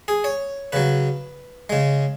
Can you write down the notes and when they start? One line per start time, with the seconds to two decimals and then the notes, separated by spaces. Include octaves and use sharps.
0.08 G#4
0.24 C#5
0.72 C#3 F#3 B4
1.70 C#3 G#3